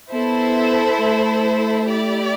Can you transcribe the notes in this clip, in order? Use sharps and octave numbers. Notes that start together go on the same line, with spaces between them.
B3 E4 A4 C5 E5
A3
E4 G4 D5